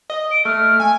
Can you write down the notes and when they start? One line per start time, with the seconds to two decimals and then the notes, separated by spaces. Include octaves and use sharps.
0.10 D#5
0.31 D7
0.45 A3 F6
0.80 G#5